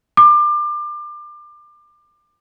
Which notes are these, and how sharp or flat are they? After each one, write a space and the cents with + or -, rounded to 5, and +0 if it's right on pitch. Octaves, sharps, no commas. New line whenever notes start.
D6 +30